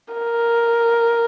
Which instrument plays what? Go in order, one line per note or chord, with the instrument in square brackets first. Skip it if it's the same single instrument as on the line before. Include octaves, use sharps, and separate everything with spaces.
[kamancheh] A#4